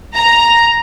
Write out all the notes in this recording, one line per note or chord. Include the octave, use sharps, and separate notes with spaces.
A#5